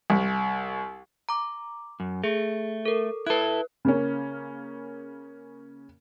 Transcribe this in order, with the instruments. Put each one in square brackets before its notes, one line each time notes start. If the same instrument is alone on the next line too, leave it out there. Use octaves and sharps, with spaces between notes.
[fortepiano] C2
[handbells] A#5 D6
[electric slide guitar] F#2
[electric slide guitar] A3 [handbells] G#4
[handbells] A4 A#4
[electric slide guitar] E4 A4 [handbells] B4 F#6
[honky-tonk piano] C#3 A#3 C#4